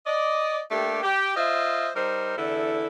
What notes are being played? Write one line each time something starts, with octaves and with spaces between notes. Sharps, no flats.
D5 D#5
A3 A#3 D4 G4
G4
F4 C5 D#5 E5
G3 D#4 A#4 C5
E2 D3 E4 A4